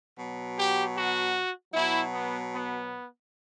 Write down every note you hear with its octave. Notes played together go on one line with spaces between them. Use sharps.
B2 F#3
G4
F#4
B2 F#3 E4
B3
B3